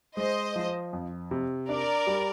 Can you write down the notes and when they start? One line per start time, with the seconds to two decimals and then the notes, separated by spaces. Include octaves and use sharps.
0.17 G#3 C5 D#5
0.56 F3
0.93 F2
1.31 C3
1.69 D4 A#4 D5
2.07 G3